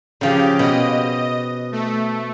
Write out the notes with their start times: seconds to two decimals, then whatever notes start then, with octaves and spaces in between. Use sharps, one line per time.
0.21 C#3 F3 G4 G#4
0.59 B2 D#5
1.72 A3